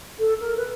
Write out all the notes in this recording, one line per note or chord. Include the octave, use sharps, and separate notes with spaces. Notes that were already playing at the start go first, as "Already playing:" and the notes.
A4
A#4
B4